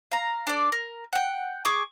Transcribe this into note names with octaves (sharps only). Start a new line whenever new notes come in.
F5 A#5
D4 A4 D5
A#4
F#5 G5
G#4 C#6 D6